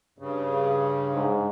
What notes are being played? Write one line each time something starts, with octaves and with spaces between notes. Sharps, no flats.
G2 C#3
G#2